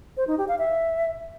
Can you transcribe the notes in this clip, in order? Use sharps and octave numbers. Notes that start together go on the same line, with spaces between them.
C5
D#4
G4
F5
E5